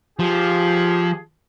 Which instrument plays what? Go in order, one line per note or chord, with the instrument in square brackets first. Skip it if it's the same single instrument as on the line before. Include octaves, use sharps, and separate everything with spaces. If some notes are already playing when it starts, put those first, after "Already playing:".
[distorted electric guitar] F3 [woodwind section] F4 G4 G#4